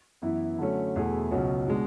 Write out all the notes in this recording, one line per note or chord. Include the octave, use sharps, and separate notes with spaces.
F#2 E3 B3 E4
D3 F#3 A3 C#4
E2 B2 A3 E4 G#4
C#2 B2 F#3 C#4
B2 G#3 D4